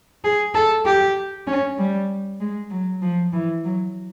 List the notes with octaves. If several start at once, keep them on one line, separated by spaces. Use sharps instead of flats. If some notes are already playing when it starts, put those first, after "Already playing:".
G#4
A4
G4
C#4
G3
G#3
F#3
F3
E3
F#3